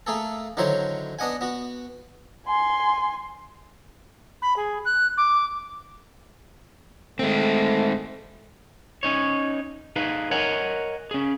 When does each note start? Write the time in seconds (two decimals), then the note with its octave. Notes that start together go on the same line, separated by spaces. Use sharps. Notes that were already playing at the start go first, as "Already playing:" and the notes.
0.07 A3 A#3 G#4 A4
0.57 D3 D#3 F#3 E4 C5 C#5
1.19 B3 D4 D#5 F#5 G#5
1.41 B3 F#4
2.46 G#5 C6
4.42 B5
4.56 G#4
4.85 F#6
5.17 D6
7.19 G#3 A3 C4
9.03 C#4 D#4 C#5
9.96 D#4 G#4 B4 F5
10.31 A#4 C#5 D#5 F#5 G#5 A#5
11.11 C#4 G#4